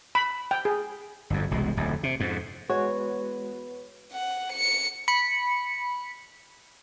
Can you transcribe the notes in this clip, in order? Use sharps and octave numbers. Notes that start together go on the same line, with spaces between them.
B5
G5
G#4
G1 F2
E1 C2 B2 G#3
D1 F2
C3
F2 G#2
E2 G#3 B3 F#4 B4 C#5
F#5
C#7
B5 C#7